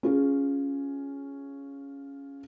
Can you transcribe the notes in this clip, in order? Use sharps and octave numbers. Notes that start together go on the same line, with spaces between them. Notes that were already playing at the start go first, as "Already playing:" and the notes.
C#4 F4 G#4